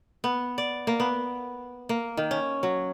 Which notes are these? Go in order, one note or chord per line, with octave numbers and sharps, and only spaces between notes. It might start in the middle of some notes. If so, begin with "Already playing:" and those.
B3
D5
A#3
B3
A#3
D#3
C#4
F#3